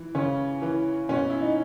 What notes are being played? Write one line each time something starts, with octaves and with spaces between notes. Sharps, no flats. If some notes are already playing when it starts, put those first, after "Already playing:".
Already playing: E3
C#3 C#4
E3
B2 C#4
E4
D#4